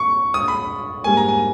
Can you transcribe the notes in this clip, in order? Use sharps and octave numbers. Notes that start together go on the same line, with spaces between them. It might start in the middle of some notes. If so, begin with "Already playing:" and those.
Already playing: C#6
D#6
B5
G#2 G3 A#3 G#5
A#5
G#5